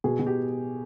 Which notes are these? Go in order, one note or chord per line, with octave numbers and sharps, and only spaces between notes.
B2 G#4
B2
G4